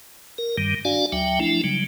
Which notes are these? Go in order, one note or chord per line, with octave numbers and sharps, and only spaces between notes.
A#4
G2 D#3 G3
D4 F#4 D5 F5 G#5
D2 F#3 E5 G5
F3 A3 D4 E4
C#3 F#3 G3